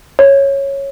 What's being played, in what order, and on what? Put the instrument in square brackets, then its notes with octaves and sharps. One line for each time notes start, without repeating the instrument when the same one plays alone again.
[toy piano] C#5